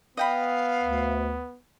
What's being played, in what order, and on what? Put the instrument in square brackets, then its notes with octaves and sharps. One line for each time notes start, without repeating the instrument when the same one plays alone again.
[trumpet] B3 [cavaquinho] D#5 G5 B5 [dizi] F5
[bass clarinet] D2